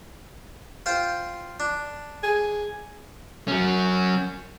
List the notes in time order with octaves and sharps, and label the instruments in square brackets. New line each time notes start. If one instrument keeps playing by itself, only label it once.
[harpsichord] F4 C5 G5
D4
[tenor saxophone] G#4
[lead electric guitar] F#3 C#4